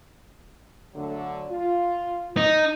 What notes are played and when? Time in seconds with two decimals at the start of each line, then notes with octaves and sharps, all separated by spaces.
0.96 D3 F#3 A3
1.50 F4
2.37 D#4